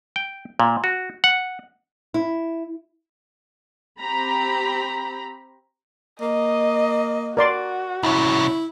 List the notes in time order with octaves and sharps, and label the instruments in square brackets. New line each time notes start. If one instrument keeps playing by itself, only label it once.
[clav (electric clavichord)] G5
A#2
F#4
F#5
[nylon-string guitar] E4
[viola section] C4 G4 A#5 B5
[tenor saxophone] A#3 [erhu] D#5
[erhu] F#4 [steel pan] A#4 D5 C6
[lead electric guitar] C2 C#4 [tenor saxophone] E4